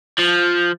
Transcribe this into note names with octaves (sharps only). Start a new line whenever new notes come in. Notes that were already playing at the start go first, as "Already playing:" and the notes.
F3